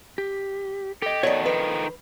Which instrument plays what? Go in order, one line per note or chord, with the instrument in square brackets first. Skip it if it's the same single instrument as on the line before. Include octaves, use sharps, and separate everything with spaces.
[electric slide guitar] G4
[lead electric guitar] G4 [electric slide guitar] A4 D#5
[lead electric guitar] B2 D#3 [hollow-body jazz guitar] C#5 D5
[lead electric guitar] D#3 F3 [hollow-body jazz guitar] B4